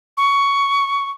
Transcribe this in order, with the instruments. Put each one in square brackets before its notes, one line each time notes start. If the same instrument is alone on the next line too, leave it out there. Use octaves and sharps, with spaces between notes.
[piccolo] C#6